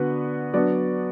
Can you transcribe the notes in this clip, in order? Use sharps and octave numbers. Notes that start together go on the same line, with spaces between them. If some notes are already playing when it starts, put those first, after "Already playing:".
Already playing: D3 B3 F#4 B4
F#3 B3 D4 F#4 D5